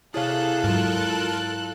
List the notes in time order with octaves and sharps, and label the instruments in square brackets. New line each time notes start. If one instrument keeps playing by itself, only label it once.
[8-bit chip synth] C3 G#4 [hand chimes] E4 C#5 F5 [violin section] A4 F#6
[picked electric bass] G#2 F#3 [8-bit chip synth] F4 A#4 A5